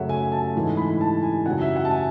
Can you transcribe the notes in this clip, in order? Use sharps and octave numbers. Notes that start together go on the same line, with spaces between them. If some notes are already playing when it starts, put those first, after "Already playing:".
Already playing: F#2 C#3 F#3 A3 E5 F#5
G#5
A5
G#2 E3 A3
B5
A5
G#5
F#2 C#3 F#3 F#5
E5
F#5
A5
G#5